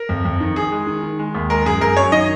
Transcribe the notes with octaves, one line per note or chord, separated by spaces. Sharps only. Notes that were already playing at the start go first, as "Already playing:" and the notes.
Already playing: A#4
F2
F2
D#3
D#3 G#4
G#3
D#3
D#3
G#3
D#2
G#3 A#4
F#2 G#4
F#2 A#4
F#2 C#5
D#3 D#5